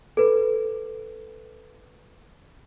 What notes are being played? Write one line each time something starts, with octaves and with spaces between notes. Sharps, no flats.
A4 B4